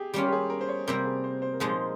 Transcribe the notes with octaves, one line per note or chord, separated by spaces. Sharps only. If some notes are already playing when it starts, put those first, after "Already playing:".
Already playing: G4 G#4
G3 A#3 C#4 F4 G4
G4
G#4
A#4
C5
C#5
C3 G3 A#3 A#4
G#4
C5
C5
A#4
A#2 F3 G#3 D#4 G#4